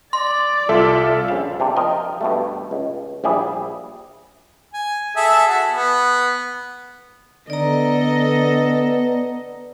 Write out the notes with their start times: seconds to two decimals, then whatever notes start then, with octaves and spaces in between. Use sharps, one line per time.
0.13 D5 C6
0.69 C2 F4 A4 E5
1.28 A#1 C#3 F5
1.60 C3 D4
1.77 F3 A#4 D#5 G5
2.21 G2 B2 A3
2.71 C#2
3.24 A#1 G3 E4 G#4 E5
4.74 G#5
5.16 G#4 A4 E5
5.47 F#4 A4
5.71 B3
7.50 D3 B3 A4 D5 D#5 A#5